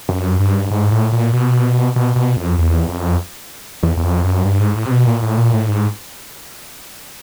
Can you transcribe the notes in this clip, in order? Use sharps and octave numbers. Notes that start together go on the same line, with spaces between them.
F#2
G2
G#2
A2
A#2
B2
B2
B2
F2
E2
F2
E2
E2
F2
F#2
G2
G#2
A2
C3
B2
A#2
A2
A#2
A2
G#2